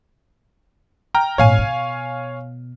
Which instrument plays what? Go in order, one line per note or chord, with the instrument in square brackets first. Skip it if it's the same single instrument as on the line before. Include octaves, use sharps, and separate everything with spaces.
[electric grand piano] G5 A#5 F6
[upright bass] G#1 A#2 [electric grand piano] C#5 F5 G#5
[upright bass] B2